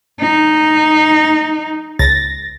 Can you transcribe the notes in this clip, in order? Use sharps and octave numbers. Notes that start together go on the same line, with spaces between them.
D#4
C#2 A6 A#6